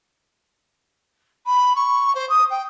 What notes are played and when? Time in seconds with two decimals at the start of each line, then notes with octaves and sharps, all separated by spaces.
1.46 B5
1.76 C#6
2.15 C5
2.29 D#6
2.51 G5